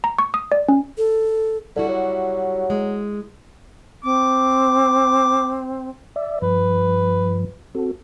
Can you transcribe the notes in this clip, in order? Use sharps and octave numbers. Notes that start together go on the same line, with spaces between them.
A#5
C#6
D#6
D5
C#4
A4
D3 G3 E4 F#4
F#3
G#3
C4 D6
D5 E5
G2 F3 B4
C4 F#4 A4